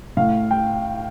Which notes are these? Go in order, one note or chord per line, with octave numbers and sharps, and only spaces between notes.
A2 F5
G5